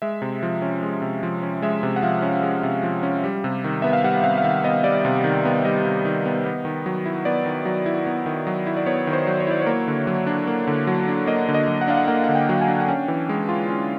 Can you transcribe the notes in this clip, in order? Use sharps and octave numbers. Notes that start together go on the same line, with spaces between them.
G#3 E5
C3
F3
C#4
G#3
C3
F3
C#4
G#3 E5
C3
F#5
F3 F5
C#4
G#3
C3
F3
C#4
G3
C3
D#3
B3 E5
F5
G3 F#5
C3 F5
F5
D#3 E5
B3 D#5
G3 D5
C3
D#3
B3
G3 D#5
C3
D#3
B3
B3
D#3
F#3
E4
B3 D5
D#3
F#3
E4
B3
D#3
F#3
E4
D5
B3 C#5
D#3
C5
F#3
C#5
E4 D5
A#3 C#5
D3
F#3
D4
A#3
D3
F#3
D4
A#3 D#5
D3
D#5
F#3
F#5
D4 F5
F#5
A#3 F#5
D3 F#5
G5
F#3
G#5
D4
F#5
C#4 G5
E3
G#3
F4
C#4